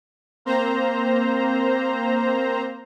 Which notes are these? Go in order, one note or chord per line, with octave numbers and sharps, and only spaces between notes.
A#3 C4 C5 A#5